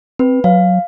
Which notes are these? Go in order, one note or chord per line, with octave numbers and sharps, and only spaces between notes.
C4 B4
F#3 F5